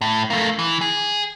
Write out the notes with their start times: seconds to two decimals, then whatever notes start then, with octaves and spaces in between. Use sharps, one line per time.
0.01 A2
0.30 A3 A#3
0.59 E3
0.81 G#4